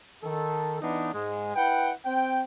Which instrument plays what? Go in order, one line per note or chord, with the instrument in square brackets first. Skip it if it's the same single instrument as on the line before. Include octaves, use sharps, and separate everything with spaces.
[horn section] D#3 A4
E3 B3 D4 D#4
G#2 G#3
E4 B4 F#5 G5
C4 G5